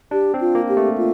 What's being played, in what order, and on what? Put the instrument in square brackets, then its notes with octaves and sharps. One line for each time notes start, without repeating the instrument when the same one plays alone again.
[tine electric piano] D4 [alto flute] G4
[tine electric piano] C4
[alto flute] F4
[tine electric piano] A#3
[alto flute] G4
[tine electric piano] A3
[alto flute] F4